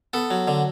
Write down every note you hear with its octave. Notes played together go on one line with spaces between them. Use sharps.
B3 A4
F#3
D3